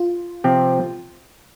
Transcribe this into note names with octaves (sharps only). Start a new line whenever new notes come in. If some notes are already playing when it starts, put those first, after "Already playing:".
Already playing: F4
C3 F3 C4 G4